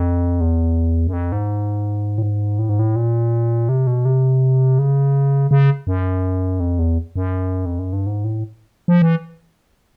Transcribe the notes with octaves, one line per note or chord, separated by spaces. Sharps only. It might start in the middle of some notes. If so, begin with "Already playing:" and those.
Already playing: F2
E2
F#2
F2
G#2
A2
G#2
A2
G#2
A2
A#2
C3
B2
C3
C#3
C#3
F#2
F2
E2
F#2
F2
F#2
G2
G#2
A2
F3
E3